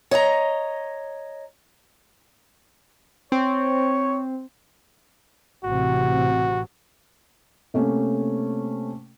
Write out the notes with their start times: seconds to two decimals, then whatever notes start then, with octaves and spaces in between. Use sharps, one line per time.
0.11 C#5 D#5 F#5 A#5
3.32 C4 C#5
5.64 A1 C3 F#4
7.74 C3 A3 A#3 C#4